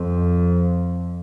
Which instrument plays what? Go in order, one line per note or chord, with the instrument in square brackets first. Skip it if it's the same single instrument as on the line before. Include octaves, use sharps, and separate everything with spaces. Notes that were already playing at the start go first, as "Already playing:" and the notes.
Already playing: [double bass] F2